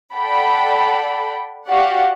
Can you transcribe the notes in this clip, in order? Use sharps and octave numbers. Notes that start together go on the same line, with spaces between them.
A4 D5 F#5 G5 B5
F#4 G4 D5 F5 F#5